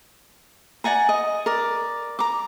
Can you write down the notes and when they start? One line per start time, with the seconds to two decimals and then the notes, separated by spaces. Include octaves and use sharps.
0.84 D5 F#5 G#5 A#5
1.09 D#5
1.46 A#4 D5
2.19 A#5 D6